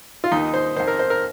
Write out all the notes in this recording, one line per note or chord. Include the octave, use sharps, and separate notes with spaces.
F4
D#2 D#3 D#4
C5
F2 D#3 C5
A#4
C5
A#4